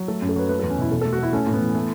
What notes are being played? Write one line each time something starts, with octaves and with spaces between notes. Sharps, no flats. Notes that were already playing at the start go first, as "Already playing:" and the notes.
Already playing: F#3
A3 A4
F#2
A4
F#3 B4
A3 B4
E2 A4
C#4
B2 E4
B2 A4
A3 A4
F#4
A3 E4
A3 C#4
A2
B3
E3
A3